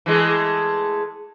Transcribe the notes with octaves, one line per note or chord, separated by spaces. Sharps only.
E3 G#3 A3